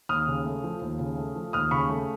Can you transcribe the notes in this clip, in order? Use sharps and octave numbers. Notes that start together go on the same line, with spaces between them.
D#2 D#6 F6
C#3
A3
F3
D#2
C#3
A3
F3
D#2 D#6 F6
C#3 B5 C#6
A3